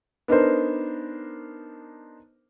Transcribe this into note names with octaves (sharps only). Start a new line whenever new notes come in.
B3 D4 D#4 A#4 C5